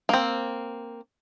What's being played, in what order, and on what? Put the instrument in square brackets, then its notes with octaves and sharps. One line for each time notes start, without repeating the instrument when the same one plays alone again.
[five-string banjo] A#3 C4